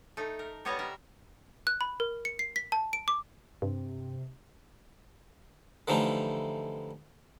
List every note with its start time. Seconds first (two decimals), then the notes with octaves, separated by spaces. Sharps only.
0.17 A3 D#4
0.39 A#4
0.65 G3 B3 C#5 D#5 A5 A#5
0.79 A#4 E5
1.67 F#6
1.81 B5
2.00 A#4
2.25 C#7
2.39 C7
2.56 B6
2.72 A5
2.93 D7
3.08 D6
3.62 G2 C3
5.88 D3 E3 F3 G3 A3 D#4